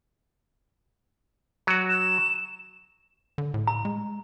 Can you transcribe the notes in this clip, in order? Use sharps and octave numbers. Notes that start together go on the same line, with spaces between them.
F#3 F#4
E7
D3
A2
A#5
G#3